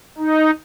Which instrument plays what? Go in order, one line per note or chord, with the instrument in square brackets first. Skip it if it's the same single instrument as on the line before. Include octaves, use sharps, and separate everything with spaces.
[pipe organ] D#4